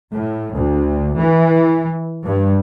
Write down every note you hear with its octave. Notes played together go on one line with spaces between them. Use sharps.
A2
D2
E3
G2